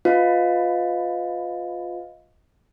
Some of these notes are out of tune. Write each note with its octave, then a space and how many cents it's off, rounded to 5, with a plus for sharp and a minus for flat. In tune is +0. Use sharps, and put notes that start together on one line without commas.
F4 +15 B4 +25 D#5 +20